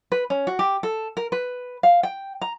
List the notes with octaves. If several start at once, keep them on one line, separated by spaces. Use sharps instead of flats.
B4
C#4
F#4
G4
A4
A#4
B4
F5
G5
A#5